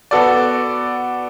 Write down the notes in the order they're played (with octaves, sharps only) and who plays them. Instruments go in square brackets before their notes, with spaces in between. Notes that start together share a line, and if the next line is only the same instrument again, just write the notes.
[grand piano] B3 F#4 A4 D5